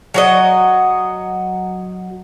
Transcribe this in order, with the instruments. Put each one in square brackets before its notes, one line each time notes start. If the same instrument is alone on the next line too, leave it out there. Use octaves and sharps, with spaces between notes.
[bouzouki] F#3 F#4 D#5